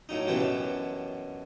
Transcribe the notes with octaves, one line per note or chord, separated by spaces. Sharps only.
A2 F#3 D#4
F#2 B2 D3 E3 F#3 G3